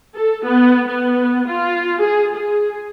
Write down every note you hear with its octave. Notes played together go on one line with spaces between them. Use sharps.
A4
B3
B3
F4
G#4
G#4